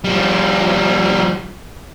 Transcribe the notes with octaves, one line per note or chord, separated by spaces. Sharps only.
F3 G3